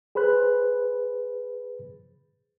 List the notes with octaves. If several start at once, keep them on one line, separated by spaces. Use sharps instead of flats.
G#4 B4 C5 B5 F#6